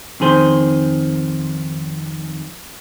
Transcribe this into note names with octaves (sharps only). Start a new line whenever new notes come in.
F2 D#3 G#4 C5